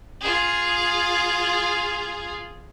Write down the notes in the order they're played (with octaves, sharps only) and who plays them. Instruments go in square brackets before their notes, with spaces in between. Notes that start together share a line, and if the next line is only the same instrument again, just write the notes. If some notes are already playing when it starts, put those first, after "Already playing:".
[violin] F4 G#4